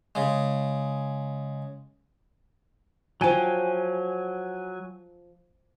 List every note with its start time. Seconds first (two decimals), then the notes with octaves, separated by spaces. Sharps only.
0.15 C#3 G#3
3.21 F3 F#3 G5 G#5